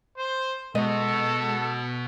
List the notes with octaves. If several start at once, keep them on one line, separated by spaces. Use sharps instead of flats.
C5
B2 G#3 F#4 A4 D#5